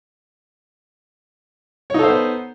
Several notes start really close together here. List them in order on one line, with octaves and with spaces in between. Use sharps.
C#5 D#4 A4 C5 B3